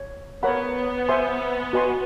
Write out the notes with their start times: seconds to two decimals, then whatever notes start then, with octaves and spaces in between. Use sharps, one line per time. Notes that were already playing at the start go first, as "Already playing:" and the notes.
Already playing: C#5
0.43 B3 A#4 C#5 F#5 B5
1.09 C5 E5 G#5 C6
1.73 F#4 B4 D#5 G#5 C6